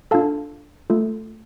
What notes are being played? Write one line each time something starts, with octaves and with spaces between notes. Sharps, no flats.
D4 F4 A4 F5 A5
A3 F4 A4